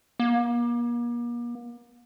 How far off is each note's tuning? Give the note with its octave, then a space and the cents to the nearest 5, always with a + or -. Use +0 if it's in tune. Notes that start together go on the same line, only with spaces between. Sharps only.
A#3 +40